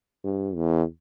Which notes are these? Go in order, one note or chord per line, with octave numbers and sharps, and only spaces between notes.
G2
E2